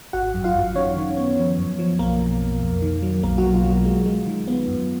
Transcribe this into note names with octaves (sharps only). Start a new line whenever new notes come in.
G#1 F#4 F#5
F#2
F4 F5
F#2
D#3 C#4 C#5
D#3
B3
F3
F#2
F3
B1 A#3 A#4
B2
B1
F2
D#3
F#3
B1 A#3 A#4
F#3 F#4
B2
F4
F#3
F4
G#3
G#3
D#3
B3
F#2